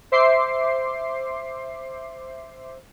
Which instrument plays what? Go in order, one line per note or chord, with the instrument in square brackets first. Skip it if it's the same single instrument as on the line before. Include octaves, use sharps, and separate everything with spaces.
[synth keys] C5 E5 C6 D6 C7